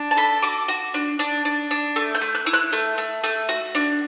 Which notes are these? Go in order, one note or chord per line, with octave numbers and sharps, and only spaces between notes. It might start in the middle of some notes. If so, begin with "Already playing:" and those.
Already playing: D4
A5
A4 B5
F#4 D6
F#4
D4
D4
D4
D4
A3
G6
A3
F#6
E4
F#6
A3
A3
A3
F#4
D4